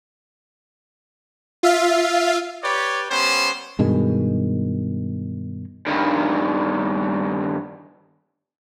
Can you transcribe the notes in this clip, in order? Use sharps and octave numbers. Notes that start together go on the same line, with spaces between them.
F4 E5 F5
G4 B4 C#5 D5
G3 B3 C#4 C5
G2 B2 D#3 G#3
G2 D#3